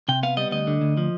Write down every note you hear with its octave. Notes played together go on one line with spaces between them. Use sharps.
C3 G5
B3 F5
G3 D#5
D2 D#5
D3
D2
F3